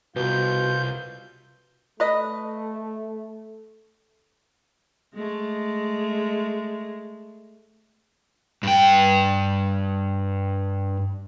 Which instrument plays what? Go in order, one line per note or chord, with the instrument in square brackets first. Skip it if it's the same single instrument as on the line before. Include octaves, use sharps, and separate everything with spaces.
[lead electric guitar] C2 [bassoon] B2 [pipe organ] F4 G6
[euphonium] A3 [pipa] B4 D#5
[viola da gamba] G#3 A3
[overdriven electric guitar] G2 G5